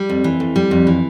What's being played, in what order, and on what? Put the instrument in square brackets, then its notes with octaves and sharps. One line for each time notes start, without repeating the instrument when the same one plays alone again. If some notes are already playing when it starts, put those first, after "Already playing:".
Already playing: [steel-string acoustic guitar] G3
F2
E3
F2
G3
F2
E3